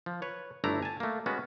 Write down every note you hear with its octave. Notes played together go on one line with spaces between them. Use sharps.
F3
B4 C#5
G1 A3 D4 E4 A#5
G#5 A5
A3 A#3
G#3 B3 C#4 F#4